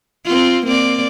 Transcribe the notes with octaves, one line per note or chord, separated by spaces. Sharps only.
C4 F4
A#3 C4 D5